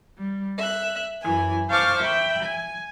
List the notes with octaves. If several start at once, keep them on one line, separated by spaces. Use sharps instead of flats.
G3
E5 F#6
F#2 E3 G#5
C5 F5 A5 C#6 D6 F6
E5 G5 B5
G#5